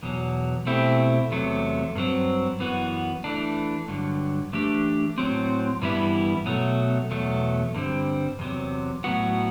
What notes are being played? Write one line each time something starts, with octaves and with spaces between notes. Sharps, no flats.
E2 B2 F#3
B2 A3 C4 E4 G4
E2 C3 F#3 A3
G2 F#3 C4
F#2 E3 B3 F#4
E3 A3 D4
G2 D3 F#3
E3 A3 D4 G4
A2 F#3 C4
G2 E3 G3 B3 E4
B2 F#3 A3
E2 B2 F#3 A3
G2 D3 G3 C4
E2 C3 F#3
A2 F#3 B3 F#4